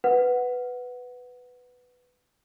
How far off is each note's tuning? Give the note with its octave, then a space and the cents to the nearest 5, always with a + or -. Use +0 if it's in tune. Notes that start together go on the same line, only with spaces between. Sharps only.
B4 +10 F#5 -5